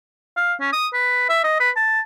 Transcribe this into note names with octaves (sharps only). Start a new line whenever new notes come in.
F5
C#4
D#6
B4
E5
D#5
B4
A5